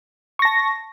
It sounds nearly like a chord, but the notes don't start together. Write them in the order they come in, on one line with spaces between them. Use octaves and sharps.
C#6 A#6 A5